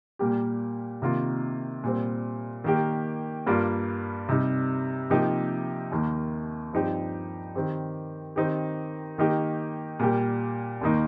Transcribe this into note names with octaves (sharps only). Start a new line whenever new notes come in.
A#2 G3 A#3 G4
C3 D#3 A#3 F4
A#2 G3 C4
D#3 A#3 G4
G2 G3 A#3 F4
C3 G3 D#4
C3 F3 A#3 D#4 G4
D#2 D#3 A#3
G2 F3 C4 D#4 G4
D#3 C4 G4
D#3 C4 D#4 G4
D#3 A#3 D#4 G4
A#2 G3 A#3 G4
D#2 D#3 A#3 D#4